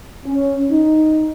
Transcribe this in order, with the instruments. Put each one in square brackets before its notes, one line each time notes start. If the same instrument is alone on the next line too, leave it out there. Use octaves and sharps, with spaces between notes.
[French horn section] C#4
D#4